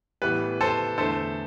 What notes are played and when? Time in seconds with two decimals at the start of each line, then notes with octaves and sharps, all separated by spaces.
0.22 A2 E3 G3 B3 B4
0.61 A4 C5
0.98 E2 D3 A3 A4 C5